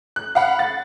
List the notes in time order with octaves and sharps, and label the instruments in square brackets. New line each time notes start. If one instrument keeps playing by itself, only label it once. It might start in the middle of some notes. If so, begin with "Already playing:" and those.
[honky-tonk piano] F#6
F5 F#5 B5
A6